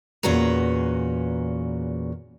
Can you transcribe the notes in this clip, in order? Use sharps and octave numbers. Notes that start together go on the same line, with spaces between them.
E2 A#2 C#4 F#4 B4 A#5